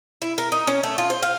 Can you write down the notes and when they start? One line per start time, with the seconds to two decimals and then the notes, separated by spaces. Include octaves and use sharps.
0.22 E4
0.38 A#4
0.52 D#4
0.67 C#4
0.83 A3
0.98 F4
1.10 C5
1.23 F5